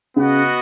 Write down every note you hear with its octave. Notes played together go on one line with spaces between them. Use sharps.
C#3 B3 F#4 D#5 F#5